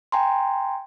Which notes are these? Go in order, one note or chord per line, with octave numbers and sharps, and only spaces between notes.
G5 G#5 A#5 C6